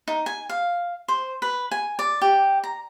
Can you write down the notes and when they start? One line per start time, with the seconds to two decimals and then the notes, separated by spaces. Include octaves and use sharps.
0.08 D#4
0.26 G#5
0.49 F5
1.08 C5
1.42 B4
1.71 G#5
1.99 D5
2.22 G4
2.64 A#5